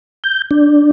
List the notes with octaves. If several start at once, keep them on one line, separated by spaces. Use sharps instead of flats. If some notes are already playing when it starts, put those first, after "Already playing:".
G6
D4